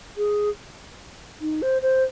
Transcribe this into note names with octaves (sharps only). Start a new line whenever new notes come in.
G#4
D#4
C5
C5